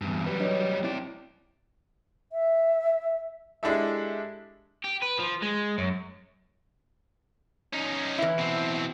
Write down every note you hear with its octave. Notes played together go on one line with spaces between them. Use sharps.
E2 G2
F#3 G3 B4
D4 C#5 D#5
C4 E4 D5 G5
E5
G#3 D4 E4 G4 A4 E5
G4
B4
F3
G#3
F#2
C#4 D#4
E3 E4
B2 C4